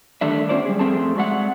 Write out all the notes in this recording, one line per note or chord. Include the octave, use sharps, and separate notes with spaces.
D3 D#3 G3 A3 D4 E5
B3 C#4 F4 C5 D5
G3 G#4
F2 D#3 A3 C4 G#4 A5
G#3 F#4 D5 E5 F#5